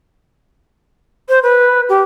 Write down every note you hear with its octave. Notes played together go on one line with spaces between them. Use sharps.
C5
B4
G4